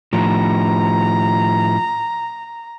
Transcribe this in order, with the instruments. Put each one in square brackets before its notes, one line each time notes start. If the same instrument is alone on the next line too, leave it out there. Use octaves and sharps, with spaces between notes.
[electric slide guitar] A2 F3 [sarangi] A#5